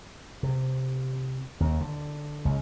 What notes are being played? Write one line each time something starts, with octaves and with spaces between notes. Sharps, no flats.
C3
D#2
D3
C#2